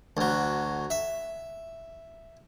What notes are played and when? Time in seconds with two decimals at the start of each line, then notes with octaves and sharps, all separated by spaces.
0.17 D2 F#3
0.90 E5